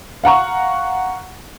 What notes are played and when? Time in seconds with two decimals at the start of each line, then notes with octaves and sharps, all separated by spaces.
0.24 F5 F#5 A#5 C#6